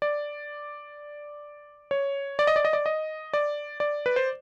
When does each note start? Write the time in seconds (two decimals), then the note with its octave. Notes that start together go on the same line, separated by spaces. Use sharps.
0.02 D5
1.91 C#5
2.39 D5
2.47 D#5
2.56 D5
2.65 D#5
2.73 D5
2.86 D#5
3.33 D5
3.80 D5
4.06 B4
4.16 C5